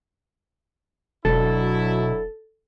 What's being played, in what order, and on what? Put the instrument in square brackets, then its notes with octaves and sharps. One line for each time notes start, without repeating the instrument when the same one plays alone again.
[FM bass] E1 [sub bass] B2 [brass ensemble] F#3 D4 E4 [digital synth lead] A4